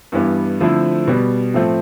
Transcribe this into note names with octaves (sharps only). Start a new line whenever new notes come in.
G2 E3 G3 B3 E4
D3 F3 A3 C4 E4
B2 G3 B3
A2 F3 A3 C4